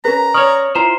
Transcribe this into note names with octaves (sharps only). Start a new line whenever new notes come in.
C#4 G#4 A#4 B4 A#5
C#5 D5 C#6 D#6 F6
E4 F4 C5 A#5